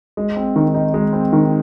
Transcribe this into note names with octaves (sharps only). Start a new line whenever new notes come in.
G#3
C4
D#3
D#4
G#3
C4
D#3